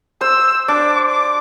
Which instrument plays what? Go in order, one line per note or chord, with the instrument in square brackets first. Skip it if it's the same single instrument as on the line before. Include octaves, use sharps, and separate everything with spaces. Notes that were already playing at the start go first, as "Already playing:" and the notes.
[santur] C5 [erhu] E6
[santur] D4 [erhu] D6
[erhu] D6